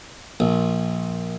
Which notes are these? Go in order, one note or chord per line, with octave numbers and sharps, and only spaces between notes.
A#1